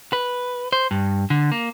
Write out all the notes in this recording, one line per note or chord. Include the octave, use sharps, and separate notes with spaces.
B4
C5
G2
D3
A#3